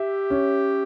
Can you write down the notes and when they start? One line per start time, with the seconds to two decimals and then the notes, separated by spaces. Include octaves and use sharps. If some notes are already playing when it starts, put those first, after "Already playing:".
Already playing: G4 E5
0.30 C#4